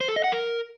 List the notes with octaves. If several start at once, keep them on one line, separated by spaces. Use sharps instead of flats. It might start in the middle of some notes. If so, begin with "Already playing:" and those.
C5
A4
D#5
F#5
A#4